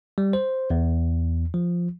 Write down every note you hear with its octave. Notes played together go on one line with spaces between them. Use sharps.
G3
C5
E2
F3